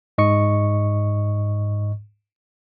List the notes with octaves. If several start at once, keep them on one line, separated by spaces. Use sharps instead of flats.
G#2 D#5 C#6 C#7